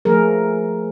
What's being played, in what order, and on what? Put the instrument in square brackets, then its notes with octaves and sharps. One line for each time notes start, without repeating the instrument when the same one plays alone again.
[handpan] F3 A3 G#4 A#4